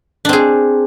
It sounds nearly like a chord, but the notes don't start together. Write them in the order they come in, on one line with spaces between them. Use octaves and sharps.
D4 C4 G#4